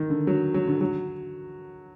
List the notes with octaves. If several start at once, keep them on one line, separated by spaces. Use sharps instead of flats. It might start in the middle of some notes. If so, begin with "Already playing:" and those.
Already playing: D#3
D3
F#3
F#3
D3
F#3